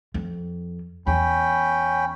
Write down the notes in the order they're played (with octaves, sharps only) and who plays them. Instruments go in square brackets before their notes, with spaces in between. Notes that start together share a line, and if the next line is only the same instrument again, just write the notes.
[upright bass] F2
[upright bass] E2 [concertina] C#4 G5 B5